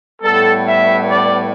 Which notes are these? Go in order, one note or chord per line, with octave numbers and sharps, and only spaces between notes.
A2 G3 B3 A4
E5
D5